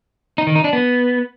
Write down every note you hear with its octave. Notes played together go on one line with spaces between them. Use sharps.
D#4
D#3
D#4
D4
B3